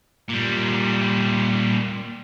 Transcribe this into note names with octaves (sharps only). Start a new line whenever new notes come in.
A#2 G3